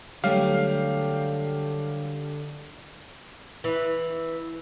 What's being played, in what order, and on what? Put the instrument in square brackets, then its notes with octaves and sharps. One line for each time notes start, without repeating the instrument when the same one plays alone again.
[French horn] D3 [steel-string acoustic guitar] F#3 G3 A3 [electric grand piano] G4 F5
[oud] E3